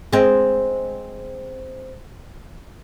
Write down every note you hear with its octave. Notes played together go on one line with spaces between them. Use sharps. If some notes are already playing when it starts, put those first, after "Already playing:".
G#3 C4